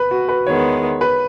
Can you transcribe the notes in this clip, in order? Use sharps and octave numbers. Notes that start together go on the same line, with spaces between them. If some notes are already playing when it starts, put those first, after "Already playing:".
Already playing: B4
F#4
B4
E2 D#3 G#3 B3 C#5
B4